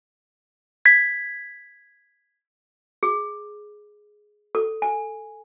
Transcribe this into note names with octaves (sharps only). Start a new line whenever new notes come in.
G#6 B6
G#4
A4
G#5